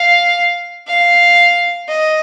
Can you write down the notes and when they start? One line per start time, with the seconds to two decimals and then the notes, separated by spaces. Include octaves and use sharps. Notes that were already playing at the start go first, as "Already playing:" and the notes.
Already playing: F5
0.87 F5
1.88 D#5